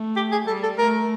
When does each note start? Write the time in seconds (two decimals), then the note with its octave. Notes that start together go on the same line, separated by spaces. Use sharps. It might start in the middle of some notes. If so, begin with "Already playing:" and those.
Already playing: A3
0.16 G4
0.32 G#4
0.47 G3 A4
0.63 A4
0.78 A3 A#4